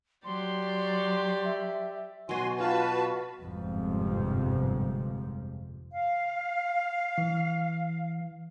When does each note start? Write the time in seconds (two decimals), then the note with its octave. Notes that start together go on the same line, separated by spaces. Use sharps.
0.24 F#3 G4 D5 C6
1.46 E5
2.29 B2 F#3 F#4 G#5 C6
2.60 F4 F#4 B4 A5
3.42 G1 F2 G#2 C3 F3
5.92 F5
7.18 E3